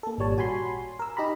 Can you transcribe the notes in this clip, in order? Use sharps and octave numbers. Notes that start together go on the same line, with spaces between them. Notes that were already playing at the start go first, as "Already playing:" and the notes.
A#3 A4
G#1 A#2 G3 C#5 A5
F#4 G#5 B5 C6
A#4 E6
D#4 G4 A#5 B5